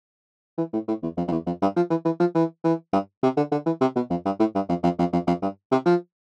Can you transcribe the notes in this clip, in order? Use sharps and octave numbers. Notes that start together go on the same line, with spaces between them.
E3
A2
A2
E2
F2
F2
E2
F2
G2
F3
E3
E3
F3
E3
E3
G2
C3
D3
D3
E3
C3
B2
F2
G2
A2
G2
F2
F2
F2
F2
F2
G2
C3
F3